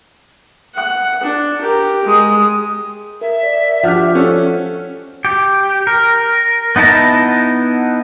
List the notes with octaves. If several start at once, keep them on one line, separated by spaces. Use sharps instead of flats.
F#5
D4
G4 A#4
G#3 D#6
A#4 E5
D5
F3 D4 G4 F#5 F6 F#6
C#4 A4
G4
A#4
B3 D#4 E4 A5 A#5